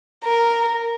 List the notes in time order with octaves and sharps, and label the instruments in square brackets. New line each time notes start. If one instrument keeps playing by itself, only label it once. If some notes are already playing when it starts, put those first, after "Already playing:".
[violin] A#4